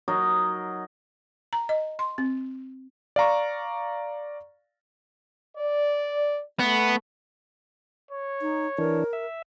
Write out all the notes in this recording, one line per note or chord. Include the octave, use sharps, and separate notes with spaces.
F#3 D#4 A#4 D#5
A#5
D#5
C6
C4
D5 F5 A#5 C#6
D5
A3 B3
C#5
D#4
E3 D4 A#4
E5